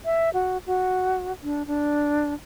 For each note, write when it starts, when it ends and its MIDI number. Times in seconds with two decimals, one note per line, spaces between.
0.05 0.30 76
0.34 0.58 66
0.67 1.32 66
1.43 1.66 62
1.67 2.34 62